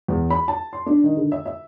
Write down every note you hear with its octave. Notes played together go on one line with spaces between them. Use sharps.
E2
B5
A5
C6
D4
D#3
D3
E5
E5